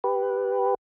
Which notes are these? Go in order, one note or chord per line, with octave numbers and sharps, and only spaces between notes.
G4 B4